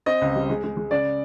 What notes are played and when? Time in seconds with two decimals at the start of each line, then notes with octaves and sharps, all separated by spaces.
0.06 C4 D#5
0.21 C#2
0.36 G3
0.50 G#3
0.64 G#3
0.77 G#3
0.91 C#3 D5